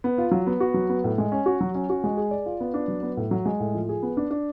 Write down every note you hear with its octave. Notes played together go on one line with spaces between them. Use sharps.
B3
F4
F#3
B3
F#4
F#3
B3
A2
G#3
C#4
F#4
F#3
C#4
F#4
G#3
G#4
D5
F4
B3
D4
F#3
B3
A2
F#3
G#3
A2
F3
G#4
B3
D4
D4